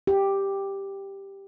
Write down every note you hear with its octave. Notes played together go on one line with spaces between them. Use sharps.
G4